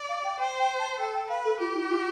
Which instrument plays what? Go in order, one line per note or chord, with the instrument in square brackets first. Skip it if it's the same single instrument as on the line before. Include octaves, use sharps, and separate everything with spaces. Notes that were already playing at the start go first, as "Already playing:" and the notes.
Already playing: [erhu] D5
[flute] F5
G5
[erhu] C5 [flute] G5
[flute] G5
A5
[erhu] A4 [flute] G5
[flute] G5
[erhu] B4 [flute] F5
[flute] A4
[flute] F4 [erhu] G4
[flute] E4
F4